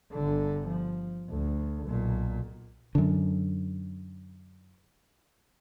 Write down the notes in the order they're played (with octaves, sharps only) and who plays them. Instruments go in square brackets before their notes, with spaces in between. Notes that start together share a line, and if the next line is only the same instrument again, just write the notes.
[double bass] G1 D3
F3
D2
B1 A#2
[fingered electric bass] F#2 D3